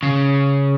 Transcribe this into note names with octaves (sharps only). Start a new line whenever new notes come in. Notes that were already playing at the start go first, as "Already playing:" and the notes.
C#3